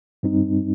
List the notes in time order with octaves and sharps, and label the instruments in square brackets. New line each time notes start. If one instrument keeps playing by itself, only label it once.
[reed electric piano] G2 G3 C4 D#4